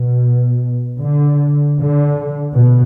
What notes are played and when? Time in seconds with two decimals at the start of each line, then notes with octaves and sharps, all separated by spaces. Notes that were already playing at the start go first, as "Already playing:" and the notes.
Already playing: B2
1.00 D3
1.77 D3
2.55 B2